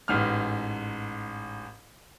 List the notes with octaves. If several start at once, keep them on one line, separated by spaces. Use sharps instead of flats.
A1 G#2 F6